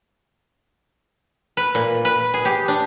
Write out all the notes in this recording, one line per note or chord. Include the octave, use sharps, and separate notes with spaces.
B4
A#2
B4
G#4
G4
D4